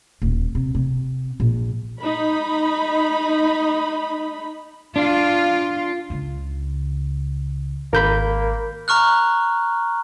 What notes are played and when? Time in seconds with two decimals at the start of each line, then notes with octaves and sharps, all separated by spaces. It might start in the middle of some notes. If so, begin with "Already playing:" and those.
0.22 D#1
0.55 C3
0.75 C3
1.40 A#1
2.02 D#4 B5
4.96 D4 F4
6.10 C#2 C#3
7.93 G#1 A#3 A#4 B5 G6
8.88 A#5 C#6 F6 F#6